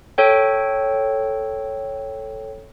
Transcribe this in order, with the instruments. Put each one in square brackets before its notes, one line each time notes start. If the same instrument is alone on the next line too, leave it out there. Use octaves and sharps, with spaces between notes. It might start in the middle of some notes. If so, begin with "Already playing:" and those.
[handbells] A4 C#5 G5